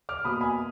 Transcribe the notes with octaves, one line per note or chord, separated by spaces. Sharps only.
D6 F6
B2 A#3 B5 D#6
G#5 B5